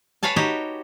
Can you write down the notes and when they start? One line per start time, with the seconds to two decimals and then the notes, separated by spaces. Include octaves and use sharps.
0.23 B4 C#5 F5 G#5 A5
0.36 D#4 F#4 G4 C#5 D#5